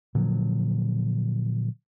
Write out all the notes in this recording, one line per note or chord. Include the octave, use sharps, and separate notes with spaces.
A#2 D3 F3 F#3